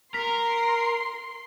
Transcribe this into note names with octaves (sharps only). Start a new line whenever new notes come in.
A#4 A#5 C6 B6